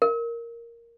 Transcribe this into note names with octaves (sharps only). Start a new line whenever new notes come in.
A#4